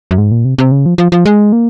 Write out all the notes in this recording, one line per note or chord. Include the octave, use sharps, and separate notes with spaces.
F#2
G#2
A#2
C3
C3
C#3
F3
F3
F3
G#3
A#3